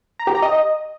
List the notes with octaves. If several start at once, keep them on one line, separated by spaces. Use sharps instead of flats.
A#5
G4
A#5
D#5